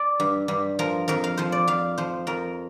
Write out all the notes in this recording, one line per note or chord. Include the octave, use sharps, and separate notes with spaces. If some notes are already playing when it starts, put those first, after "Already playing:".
Already playing: D5
G2
G2
F3 A#4
F2 A#4
F5
F3 C5
D5
F2 F5
F3 C5
F2 A#4